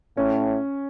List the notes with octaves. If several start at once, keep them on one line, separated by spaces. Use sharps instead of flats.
A2 C#4